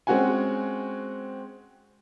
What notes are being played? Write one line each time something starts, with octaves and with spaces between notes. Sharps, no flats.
G#3 C4 C#4 F#4 F#5 G#5